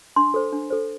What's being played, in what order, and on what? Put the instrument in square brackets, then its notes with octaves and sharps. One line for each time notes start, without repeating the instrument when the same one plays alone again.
[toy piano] D4 C6
A4 C5
D4
A4 C5